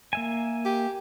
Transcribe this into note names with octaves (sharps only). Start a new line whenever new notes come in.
A#3 E5 G#5
G4